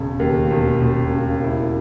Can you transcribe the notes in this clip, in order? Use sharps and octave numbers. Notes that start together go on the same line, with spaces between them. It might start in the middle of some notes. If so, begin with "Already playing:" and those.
Already playing: E1 C#3
D#2
E1
E1
C#3
E4